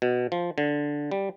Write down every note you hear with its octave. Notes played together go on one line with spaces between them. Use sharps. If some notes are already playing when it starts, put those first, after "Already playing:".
B2
F3
D3
G3